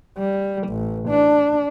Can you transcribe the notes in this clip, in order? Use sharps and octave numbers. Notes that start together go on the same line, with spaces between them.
G3
A1
D4